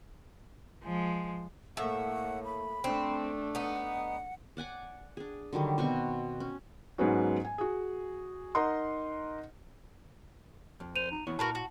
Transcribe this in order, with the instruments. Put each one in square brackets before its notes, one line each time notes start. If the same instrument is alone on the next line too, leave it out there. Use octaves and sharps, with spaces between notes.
[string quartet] F3 G#3
[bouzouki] A2 E5 [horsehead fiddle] A3 A#3 [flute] F#5
[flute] B5
[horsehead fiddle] A3 D4 [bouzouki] C4
[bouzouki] B3 D#4 [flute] F#5
[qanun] D5 F#5 G#5 D6
D4 G#4
D3 D#3 F#3 G3
B2 C4 F#4 C#6
C#4
[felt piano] G#2 F#3 G#3 B3 C#4 F#4
G#5
F#4 G#4
D#4 A#4 D#5 F#5 C6
[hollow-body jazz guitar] F2
[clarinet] C5 [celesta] D#7 F7
[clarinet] D#4
[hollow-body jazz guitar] E2 B3 C#5 [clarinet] E4
[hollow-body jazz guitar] A#2 [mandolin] F#4 A#4 B4 [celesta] A5
[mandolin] F#4